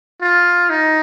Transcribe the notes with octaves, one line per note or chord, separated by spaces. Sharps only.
F4
D#4